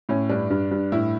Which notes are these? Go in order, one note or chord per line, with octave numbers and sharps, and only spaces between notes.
A2 C#4
G2 D4
G2
G2
A2 E4